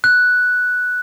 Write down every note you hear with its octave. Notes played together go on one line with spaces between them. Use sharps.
F#6